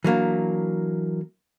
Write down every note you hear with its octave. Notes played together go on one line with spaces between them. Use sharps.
E3 F#3 A#3 D4